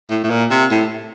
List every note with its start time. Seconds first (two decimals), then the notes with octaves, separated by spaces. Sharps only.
0.10 A2
0.23 A2
0.30 A#2
0.51 C3
0.71 A2